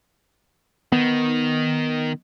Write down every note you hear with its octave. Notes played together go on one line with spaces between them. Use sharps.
D#3 B3